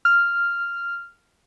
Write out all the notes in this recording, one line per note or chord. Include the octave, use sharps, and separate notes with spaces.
F6